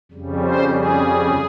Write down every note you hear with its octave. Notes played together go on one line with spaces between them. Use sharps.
F2 C#3 G3
C5
G#4